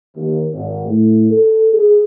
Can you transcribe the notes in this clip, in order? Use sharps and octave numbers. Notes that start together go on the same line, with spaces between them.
D#2
G#1
A2
A4
G#4